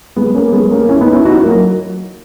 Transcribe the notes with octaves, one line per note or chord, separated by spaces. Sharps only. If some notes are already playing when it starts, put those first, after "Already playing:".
G#3 B3
A#3 C#4
G#3 B3
A#3 C#4
C#4 E4
B3 D#4
C#4 E4
D#4 F#4
F#3 A#3